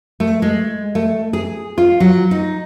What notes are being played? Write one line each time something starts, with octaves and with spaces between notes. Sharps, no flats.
A3
G#3
A3
G#4
F4
F#3
D#4